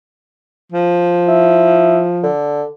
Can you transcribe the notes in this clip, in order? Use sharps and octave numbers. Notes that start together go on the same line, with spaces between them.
F3
E4
D3